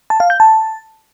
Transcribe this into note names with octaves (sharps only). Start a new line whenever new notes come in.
A5
F5
G6
A5